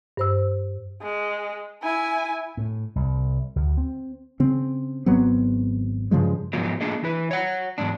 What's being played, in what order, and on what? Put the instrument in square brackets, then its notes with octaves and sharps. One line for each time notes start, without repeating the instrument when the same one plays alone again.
[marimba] G2 C5 E6
[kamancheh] G#3
E4 G#5
[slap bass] A2
C2
D2
C4
[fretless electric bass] C#3 C4
G#1 F#3 B3 C4
G2 C#3 F3 G#3
[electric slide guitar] G#2 B2 F3 F#3 A#3
A3 A#3 D4 G#4 D#5
E3 E4 B4
C#5 F#5
E2 G#2 D4